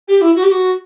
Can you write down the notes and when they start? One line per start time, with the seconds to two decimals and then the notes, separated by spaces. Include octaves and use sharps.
0.08 G4
0.21 E4
0.36 F#4
0.43 G4
0.51 F#4